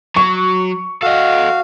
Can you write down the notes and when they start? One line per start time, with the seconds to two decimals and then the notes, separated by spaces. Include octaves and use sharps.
0.17 F#3 C#6
1.03 F#4 A4 D#5 F5